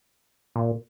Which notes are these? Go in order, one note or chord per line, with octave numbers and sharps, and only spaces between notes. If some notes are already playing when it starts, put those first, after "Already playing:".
A#2